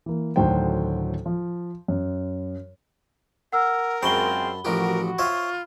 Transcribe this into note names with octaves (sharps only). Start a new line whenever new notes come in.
E3 A#3
D2 A2 D#3 F#3 C5 G5
F3
F#2
A#4 F#5 E6 F6
F#2 G#3 C4 F4 A5 B5 C#6 G7
A1 F3 F#4 G4 A#4
F4 C5 C#5 E5